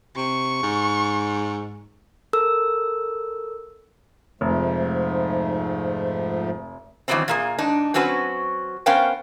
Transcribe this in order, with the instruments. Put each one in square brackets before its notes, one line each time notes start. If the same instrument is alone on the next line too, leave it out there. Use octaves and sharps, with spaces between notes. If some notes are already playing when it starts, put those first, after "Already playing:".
[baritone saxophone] C3 [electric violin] C#6
[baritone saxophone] G#2
[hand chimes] A4 A#4 E6
[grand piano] F1 [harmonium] G#2 F3 A3
[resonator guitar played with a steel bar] D#3 E3 F#3 G3 B3 C4
A#2 A#3 G#4
G#2 D4 D#4
F#3 C4 C#4 F#4 B4
B3 C#4 A#4 C5 F5 G5